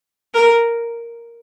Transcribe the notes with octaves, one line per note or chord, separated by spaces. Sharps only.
A#4